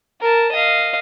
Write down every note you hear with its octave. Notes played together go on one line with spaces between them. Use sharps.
A#4 A5
D#5 F5